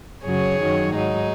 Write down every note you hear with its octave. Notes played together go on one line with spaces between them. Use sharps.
F#2 C#3 F#3 G#4 C#5
F#2 D#3 F#3
G#2 F#3 D#4 G#4